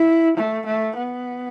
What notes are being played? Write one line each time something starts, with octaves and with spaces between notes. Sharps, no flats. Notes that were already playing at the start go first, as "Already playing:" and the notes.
Already playing: E4
A3
A3
B3